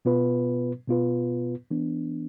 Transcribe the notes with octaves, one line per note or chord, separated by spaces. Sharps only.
B2 B3 F4 B4
B2 B3 F4 B4
E3 B3 D4